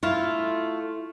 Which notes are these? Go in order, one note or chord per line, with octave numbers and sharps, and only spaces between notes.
A3 E4 F4